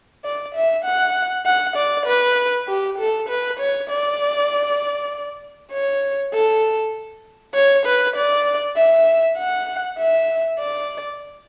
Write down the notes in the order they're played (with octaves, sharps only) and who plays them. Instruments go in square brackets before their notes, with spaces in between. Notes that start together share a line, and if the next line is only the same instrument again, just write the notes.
[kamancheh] D5
E5
F#5
F#5
D5
B4
G4
A4
B4
C#5
D5
C#5
A4
C#5
B4
D5
E5
F#5
E5
D5